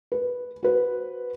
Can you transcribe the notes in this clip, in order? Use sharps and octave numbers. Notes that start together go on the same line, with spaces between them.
B4
F#4 B4 C5